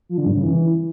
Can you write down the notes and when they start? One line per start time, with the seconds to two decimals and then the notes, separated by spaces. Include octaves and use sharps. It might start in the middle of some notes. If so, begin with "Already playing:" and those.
0.09 F3
0.18 D3
0.26 G2
0.35 C#3
0.43 E3